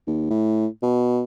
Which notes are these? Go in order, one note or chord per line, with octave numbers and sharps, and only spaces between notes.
D#2
A2
B2